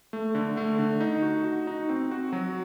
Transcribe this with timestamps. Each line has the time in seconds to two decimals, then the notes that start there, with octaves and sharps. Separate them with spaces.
0.13 A3
0.35 D3
0.57 A3
0.79 D3
1.00 D#4
1.22 F#4
1.44 F#4
1.67 D#4
1.89 C4
2.11 F#4
2.33 F#3